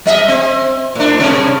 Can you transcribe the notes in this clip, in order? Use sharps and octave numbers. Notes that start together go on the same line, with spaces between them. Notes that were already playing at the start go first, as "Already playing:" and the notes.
G3 D#5 E5
C4
A2 D4
G2 C3 C#4